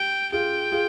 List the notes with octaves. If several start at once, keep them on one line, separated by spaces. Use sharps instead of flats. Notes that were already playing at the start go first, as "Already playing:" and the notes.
Already playing: G4 G5
F4 G#4 G5
F4 G#4